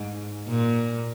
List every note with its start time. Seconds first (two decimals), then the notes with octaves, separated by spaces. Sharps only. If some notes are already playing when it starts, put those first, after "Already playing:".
Already playing: G#2
0.48 A#2